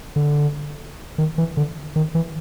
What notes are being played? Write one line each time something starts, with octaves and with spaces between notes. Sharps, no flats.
D3
D#3
E3
D3
D#3
E3